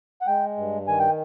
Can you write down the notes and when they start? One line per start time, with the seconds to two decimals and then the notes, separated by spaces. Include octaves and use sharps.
0.22 F#5
0.27 G#3 G5
0.57 G2
0.88 D#3 G#5
0.99 G5